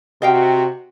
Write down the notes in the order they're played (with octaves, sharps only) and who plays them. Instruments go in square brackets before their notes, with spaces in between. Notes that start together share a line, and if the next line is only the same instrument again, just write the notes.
[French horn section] C3 F#4 [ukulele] D#5 F5 G5